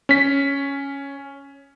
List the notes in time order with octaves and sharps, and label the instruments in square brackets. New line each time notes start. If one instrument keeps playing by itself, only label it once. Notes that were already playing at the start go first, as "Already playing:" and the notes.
[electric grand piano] C#4 B6